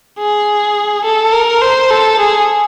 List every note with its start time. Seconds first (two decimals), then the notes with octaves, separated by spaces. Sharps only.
0.20 G#4
1.05 A4
1.33 A#4
1.62 C5
1.91 A4
2.20 G#4